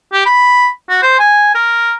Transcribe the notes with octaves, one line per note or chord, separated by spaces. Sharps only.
G4
B5
F#4
C5
G#5
A#4